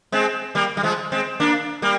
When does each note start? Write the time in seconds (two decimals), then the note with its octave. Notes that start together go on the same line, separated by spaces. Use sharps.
0.12 G#3 C4
0.55 G3 A#3
0.77 G3
0.83 F3 G#3
1.12 G#3 C4
1.40 A#3 D4
1.82 G3 A#3